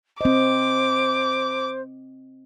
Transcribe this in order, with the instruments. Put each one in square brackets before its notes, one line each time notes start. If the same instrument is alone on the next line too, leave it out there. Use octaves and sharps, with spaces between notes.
[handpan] C4 D#5 [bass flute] C5 [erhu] D6